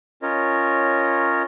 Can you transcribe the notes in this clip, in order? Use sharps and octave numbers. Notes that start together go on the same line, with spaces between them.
C#4 F4 A#4 C#5 D#5